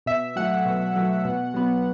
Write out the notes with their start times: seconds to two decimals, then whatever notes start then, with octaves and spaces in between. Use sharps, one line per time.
0.06 B2 E5
0.36 F#3 A3 F#5
0.66 B2
0.96 F#3 A3
1.25 B2
1.54 F#3 B3